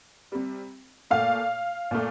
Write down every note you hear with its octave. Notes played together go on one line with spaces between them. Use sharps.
C3 G3
A#2 A3 F5
A#2 A3